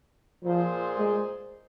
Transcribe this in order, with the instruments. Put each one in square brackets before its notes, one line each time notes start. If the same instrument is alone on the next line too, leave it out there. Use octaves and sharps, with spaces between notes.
[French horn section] A#2 A#3 G#4 C5 [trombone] F3
[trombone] G#3